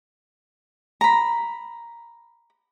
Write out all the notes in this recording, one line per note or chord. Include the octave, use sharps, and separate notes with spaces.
A#5 B5